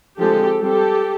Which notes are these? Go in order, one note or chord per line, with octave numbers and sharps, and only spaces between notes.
D3 F3 G#3 C4 G4 A4
G3 C4 G4 A4